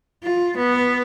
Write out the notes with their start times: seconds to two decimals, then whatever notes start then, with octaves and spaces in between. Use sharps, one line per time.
0.23 F4
0.57 B3